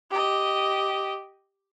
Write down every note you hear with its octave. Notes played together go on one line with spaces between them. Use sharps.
G4 D#5